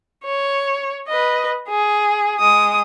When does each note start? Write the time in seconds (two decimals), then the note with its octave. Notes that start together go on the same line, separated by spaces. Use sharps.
0.24 C#5
1.08 B4 D#5
1.69 G#4
2.39 G#3 D#6